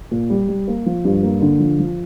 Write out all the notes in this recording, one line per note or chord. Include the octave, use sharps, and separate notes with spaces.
A#2
G3
G3
A#3
F3
G2
A#3
D3
F3
F3